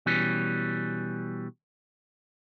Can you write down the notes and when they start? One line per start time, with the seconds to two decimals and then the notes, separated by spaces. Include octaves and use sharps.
0.06 B2 E3 G3 C#4